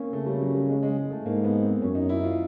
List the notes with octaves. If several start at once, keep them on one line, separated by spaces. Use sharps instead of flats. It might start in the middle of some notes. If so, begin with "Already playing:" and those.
Already playing: A#3 C4 C#4
C#3 A3
G3
F#3
G3
G#3
G#3
G#3
A3
G#2 A#3
B3
C4
F#2 C#4
D#4
E4
F4